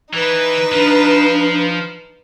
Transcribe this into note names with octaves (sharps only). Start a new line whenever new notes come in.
E3 D#4 B4
F3 D4